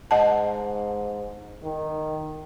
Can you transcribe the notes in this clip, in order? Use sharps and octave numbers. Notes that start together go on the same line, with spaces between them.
G#2 D#5 F#5 A5
D#3